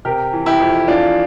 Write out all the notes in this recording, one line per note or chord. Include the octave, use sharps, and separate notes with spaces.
C3 G4 A#4
E3
E4 G4
F2
E3 D4 F4